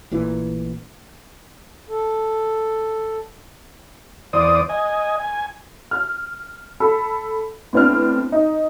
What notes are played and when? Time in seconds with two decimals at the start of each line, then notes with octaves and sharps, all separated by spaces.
0.11 A1 A#2 E3
1.89 A4
4.33 E2 C5 D5 D#6
4.69 D#5 G#5
5.20 G#5
5.91 F6
6.80 A4 B5 E6
7.73 A2 B3 C4 D4 F6
8.32 D#4